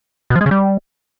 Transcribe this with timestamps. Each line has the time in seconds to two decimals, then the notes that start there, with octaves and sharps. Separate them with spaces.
0.30 B2
0.36 F3
0.41 G#3
0.46 C#3
0.51 G3